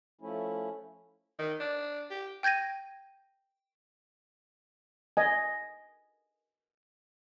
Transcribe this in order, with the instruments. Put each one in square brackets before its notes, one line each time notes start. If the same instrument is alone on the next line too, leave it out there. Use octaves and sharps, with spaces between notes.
[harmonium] F3 A3 C#4 E4
[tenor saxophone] D#3
D4
G4
[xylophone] G5 G6 G#6 A#6 D#7
[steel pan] D#5 G#5